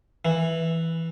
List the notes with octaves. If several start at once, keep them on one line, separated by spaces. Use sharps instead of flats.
E3